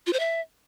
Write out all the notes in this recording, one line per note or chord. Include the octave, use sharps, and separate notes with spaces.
F4
C5
E5